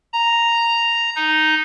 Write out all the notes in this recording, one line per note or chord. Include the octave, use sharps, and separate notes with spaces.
A#5
D#4